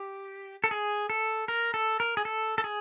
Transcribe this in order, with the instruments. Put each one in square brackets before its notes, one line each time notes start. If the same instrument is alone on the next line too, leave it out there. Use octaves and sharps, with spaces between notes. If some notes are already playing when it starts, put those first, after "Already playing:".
Already playing: [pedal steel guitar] G4
A4
G#4
A4
A#4
A4
A#4
G#4
A4
A4
G#4